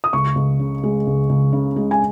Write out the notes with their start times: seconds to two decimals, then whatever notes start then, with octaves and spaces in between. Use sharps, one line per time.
0.04 D#6
0.13 C#2 C#6
0.36 C#2
0.59 C#3
0.84 G#3
1.07 C#2
1.29 C#2
1.53 C#3
1.76 G#3
1.91 G#5